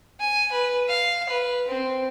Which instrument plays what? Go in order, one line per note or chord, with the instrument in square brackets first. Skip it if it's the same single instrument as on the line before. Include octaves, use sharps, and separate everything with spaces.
[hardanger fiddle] G#5
B4
F5
B4
C4